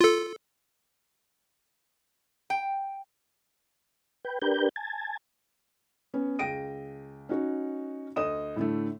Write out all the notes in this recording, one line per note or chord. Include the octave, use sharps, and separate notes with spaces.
F4 A4
G5
B4 G5
D4 G4 A#4 B4 G6
G#5 A5
B3 C#4
C#2 G5 A#6 D7 D#7
C#4 D#4 F#4
D2 D#5 D#6 E7
A2 D3 A3